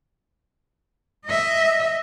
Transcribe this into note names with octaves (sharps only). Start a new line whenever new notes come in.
D#5 E5